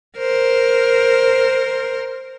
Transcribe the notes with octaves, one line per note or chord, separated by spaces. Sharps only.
A#4 C5